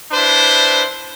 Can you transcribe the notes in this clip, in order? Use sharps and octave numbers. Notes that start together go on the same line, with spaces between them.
D4 E4 B4 C5